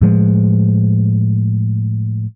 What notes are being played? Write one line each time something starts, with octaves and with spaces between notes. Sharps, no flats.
A2 F3 G#3